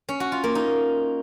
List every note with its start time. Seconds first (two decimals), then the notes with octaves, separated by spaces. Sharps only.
0.09 C#4
0.20 F#4
0.32 F4
0.44 A#3
0.55 D#4